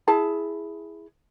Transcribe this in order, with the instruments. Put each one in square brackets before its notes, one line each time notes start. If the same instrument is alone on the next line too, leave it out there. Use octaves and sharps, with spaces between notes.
[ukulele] E4 G#4 A5